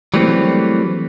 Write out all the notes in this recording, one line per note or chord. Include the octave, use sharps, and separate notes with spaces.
E3 F#3 G3 A3 A#3 C4